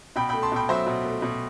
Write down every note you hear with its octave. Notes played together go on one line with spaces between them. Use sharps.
B2 G5 B5
A3 G5 B5
A5 C6
B2 G5 B5
F#3 C5 E5
B2
A3
B2